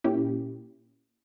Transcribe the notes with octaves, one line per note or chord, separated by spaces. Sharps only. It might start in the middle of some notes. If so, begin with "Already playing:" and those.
A#2 A#3 C#4 E4 G4